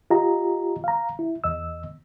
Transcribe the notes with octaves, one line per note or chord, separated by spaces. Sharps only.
F4 G4 D#5 A#5
F5 A#5
E4
E2 D#5 E6